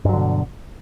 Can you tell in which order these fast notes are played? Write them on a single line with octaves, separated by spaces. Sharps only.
G2 F#3 D3 B2